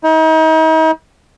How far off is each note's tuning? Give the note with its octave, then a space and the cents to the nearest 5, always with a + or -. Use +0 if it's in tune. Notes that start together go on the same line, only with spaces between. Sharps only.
D#4 +40